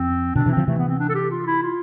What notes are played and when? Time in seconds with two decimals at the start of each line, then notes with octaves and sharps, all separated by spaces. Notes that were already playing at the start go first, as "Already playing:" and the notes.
Already playing: F2 C4
0.35 B2 D3 D4
0.46 C3 E3
0.52 C4
0.57 D3 F3
0.67 C3 E3 A3
0.78 B3
0.88 C4
0.99 D4
1.09 A4
1.15 G4
1.31 F4
1.47 E4
1.63 F4